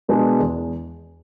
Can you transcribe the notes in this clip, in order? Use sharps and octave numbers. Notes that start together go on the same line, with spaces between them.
B2 G#3 B3 D4
E2